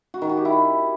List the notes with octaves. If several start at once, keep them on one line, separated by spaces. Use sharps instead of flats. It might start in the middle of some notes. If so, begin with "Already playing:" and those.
F#4
D#3
F#4
G4
E4